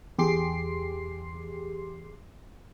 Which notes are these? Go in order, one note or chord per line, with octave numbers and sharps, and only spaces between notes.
E2 G4 G#4 C6 D6 C7